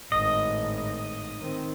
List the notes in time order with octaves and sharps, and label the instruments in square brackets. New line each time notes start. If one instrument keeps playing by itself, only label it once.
[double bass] G#1 A2 [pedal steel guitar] D#5
[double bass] D#3 C4